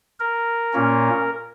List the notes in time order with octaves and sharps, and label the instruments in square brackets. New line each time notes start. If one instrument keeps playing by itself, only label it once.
[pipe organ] A#4
A#2 A#3 C#4